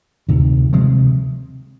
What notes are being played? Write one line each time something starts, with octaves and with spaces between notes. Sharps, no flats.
D2 C3 D#3
C3 F3 G#3